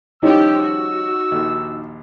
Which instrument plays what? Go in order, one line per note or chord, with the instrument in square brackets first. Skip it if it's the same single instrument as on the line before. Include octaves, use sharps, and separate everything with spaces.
[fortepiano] D#3 G3 C#4 [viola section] F3 G4 [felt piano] D#4 [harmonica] E6
[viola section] F#4
[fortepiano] A#1 D#2